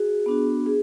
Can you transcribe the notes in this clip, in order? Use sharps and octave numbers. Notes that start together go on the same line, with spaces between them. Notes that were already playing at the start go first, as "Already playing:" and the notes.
Already playing: F#4 G#4
B3 D4 F#4
G#4